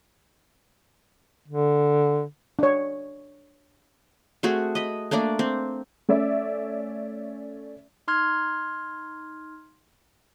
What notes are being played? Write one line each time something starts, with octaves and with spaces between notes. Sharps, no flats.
D3
D4 C#5
A3 C4 F#4 G#4
D#5 B5
A3 A#3 D4 D5
C4
A3 C#4 D5 E5
D#4 C6 F6 G#6